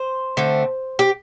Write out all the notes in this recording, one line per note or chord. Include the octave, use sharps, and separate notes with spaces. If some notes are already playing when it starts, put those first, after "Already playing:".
Already playing: C5
D3 A3 C4
G4